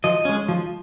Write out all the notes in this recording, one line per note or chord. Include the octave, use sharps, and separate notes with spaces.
F3 D#5
G#3 C#4
F3